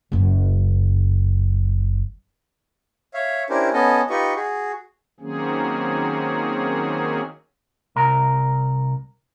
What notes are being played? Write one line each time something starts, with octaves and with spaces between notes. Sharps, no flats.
F#1 F#2
C#5 E5 F5
C#4 D4 E4 G4 A#4 C5
B3 C#4 A4 D#5
D#4 F4 G4 B4 D#5 C#6
F#4 G#4
D#3 F#3 A#3 C4 C#4 G#4
C2 A#4